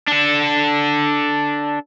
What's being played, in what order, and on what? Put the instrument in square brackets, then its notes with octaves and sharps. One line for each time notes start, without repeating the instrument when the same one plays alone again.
[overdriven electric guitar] D4 A4